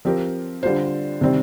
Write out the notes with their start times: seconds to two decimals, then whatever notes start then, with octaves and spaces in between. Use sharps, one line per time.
0.05 F3 C4 G4 A#4
0.63 D3 G3 D4 F4 C5
1.21 C3 D#3 G3 C4